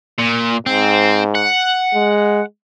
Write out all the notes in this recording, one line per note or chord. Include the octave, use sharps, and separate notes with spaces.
A#2
G#2 C4
F#5
G#3